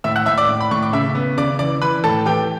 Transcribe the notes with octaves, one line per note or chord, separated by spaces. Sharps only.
A2 E5 E6
F#5 F#6
A2 E5 E6
D5 D6
A2
B5
A2 C#6
D6
C#3 E5 E6
B3
C#3 D5 D6
E3 D5 D6
E3 B4 B5
A2 A4 A5
E3 G4 G5